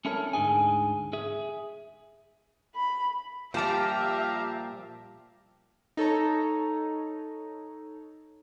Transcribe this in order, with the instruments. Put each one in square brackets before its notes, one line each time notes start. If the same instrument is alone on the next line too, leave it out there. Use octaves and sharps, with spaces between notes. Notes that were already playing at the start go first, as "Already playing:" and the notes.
[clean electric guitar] C#4 D4 E4 A4 A#4 C#5
D2 G#2 D4 D#4 G#4 G#5
G#4 E5
[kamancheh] B5
[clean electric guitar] A#2 A5 [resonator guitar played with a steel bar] F3 G3 [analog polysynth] G4 F5 A#5 [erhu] E5
[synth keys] D#4 A4 C#5 A#5